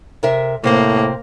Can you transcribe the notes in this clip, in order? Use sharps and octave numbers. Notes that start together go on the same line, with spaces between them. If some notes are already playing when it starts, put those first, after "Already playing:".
C3 A#4 E5
A2 C3 A#3 C4 C5